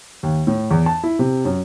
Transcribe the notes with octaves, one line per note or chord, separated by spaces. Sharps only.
D#2
A2
E2
A5
E4
C3
F#2